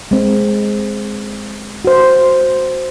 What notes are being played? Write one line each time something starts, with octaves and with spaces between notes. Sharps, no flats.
G#3 C4
F#4 C5